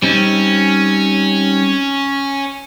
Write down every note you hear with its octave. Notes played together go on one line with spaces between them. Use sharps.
G3 C4 C#4 D#4